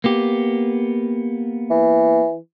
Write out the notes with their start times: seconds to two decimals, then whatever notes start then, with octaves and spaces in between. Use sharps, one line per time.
0.04 A#3 B3 G4
1.70 E3